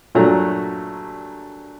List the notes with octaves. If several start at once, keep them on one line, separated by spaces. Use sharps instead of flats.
G2 A#2 F#3 A3 A#5